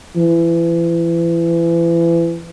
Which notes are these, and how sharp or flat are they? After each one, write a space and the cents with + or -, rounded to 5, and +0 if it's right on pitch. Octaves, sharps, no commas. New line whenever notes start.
E3 +35